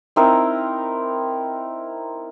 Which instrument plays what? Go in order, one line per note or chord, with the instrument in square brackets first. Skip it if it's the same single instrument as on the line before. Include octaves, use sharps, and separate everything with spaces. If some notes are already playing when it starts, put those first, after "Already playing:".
[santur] C4 D#4 E4 A#4